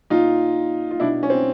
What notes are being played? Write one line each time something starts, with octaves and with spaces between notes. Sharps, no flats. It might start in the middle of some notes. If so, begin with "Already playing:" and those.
A#2 D#4 F4
F4
B2 D4 E4
C#4
C4